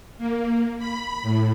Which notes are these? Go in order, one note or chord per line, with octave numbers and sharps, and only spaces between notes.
A#3
B5
A2